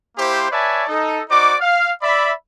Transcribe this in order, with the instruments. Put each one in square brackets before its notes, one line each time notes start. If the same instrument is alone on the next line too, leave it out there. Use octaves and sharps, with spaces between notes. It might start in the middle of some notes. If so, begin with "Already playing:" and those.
[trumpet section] A#3 E4 G4 C5
B4 C#5 D5 E5 G#5 A5
D#4 A4
D#4 F#4 C5 D5 D6
F5
D5 E5 B5